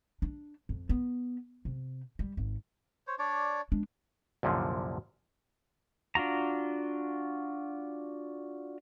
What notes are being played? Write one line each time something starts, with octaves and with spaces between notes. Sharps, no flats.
D4
F2
B3
C3
G3
G#1
C5 C#5
D4 C#5 D5
G#3 D4
C2 F#2 A#2 D3 F3
D4 F4 F#4 A#5